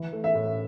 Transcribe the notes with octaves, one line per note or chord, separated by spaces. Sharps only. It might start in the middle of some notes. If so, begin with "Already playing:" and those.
Already playing: E3
A3
E5
A2